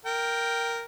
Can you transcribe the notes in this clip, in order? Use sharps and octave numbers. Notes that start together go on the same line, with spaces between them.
A#4 G5